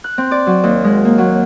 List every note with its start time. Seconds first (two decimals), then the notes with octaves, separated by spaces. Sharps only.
0.04 F#6
0.18 C4
0.31 D5
0.47 F#3
0.63 D#2
0.84 G#3
1.05 A#3
1.18 F#3